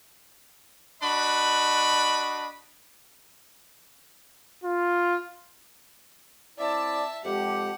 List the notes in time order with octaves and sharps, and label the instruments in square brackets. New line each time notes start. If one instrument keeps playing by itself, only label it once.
[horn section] D4 F#4 D#5 B5
[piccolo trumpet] F4
[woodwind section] C4 E4 D5 [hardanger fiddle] E5 A5
[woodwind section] F2 G#3 G4 [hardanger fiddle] F#5